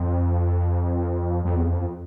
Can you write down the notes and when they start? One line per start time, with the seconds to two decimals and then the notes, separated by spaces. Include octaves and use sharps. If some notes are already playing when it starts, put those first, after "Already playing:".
Already playing: F2
1.45 F2
1.56 E2
1.66 F2